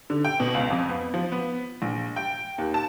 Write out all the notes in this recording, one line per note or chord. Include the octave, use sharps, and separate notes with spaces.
D3
G5
B2
C#2
F2
B3
F3
B3
A#1
G5
D#2
A5